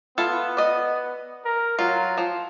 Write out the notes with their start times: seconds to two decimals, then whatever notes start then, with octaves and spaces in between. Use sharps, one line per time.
0.18 B3 E4 F4 A4
0.57 D5 D#5
1.45 A#4
1.79 F#3 F4
2.18 F3